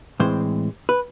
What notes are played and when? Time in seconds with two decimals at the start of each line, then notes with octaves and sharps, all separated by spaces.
0.20 A2 E3 G#3 C4 C5
0.89 B4